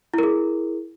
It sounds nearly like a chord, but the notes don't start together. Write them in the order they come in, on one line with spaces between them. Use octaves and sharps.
E4 A#4 G#4